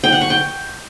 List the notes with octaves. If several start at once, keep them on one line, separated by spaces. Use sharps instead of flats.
G5
F#5
C#6
G5